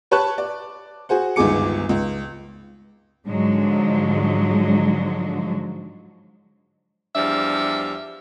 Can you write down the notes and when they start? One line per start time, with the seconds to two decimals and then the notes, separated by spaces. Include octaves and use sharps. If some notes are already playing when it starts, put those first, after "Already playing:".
0.11 G4 B4 C#5 A5 C#6 F#6
0.38 D5
1.09 F#4 G#4 C5 F#5
1.36 G1 C#2 D#3 G#4 D6 C#7
1.89 C#2
3.26 G#2 D3 F3 F#3 G#3
7.16 E2 F3 G3 D4 E5